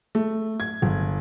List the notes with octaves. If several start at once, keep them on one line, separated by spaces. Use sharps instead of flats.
A3
G#6
G1